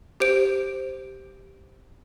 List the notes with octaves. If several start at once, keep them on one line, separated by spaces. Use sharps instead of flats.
G4 C5 D7